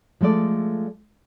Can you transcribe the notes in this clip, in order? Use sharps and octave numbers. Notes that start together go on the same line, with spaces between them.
F3 G#3 A3 A4 D5